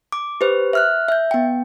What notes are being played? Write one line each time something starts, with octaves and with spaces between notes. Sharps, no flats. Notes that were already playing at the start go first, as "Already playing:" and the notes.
D6
G4 B4 C5
E5 F6 F#6
E5 G6
B3 G5